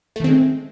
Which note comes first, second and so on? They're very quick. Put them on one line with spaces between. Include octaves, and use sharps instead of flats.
A3 D#3 C4 G#3